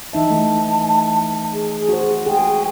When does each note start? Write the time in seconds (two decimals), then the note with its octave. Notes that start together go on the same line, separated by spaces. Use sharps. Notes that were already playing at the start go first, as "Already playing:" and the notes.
0.13 E3 D#4 E5 A5
0.30 E3 A3
1.52 G#4
1.89 F#4 C5
2.26 G#4 G5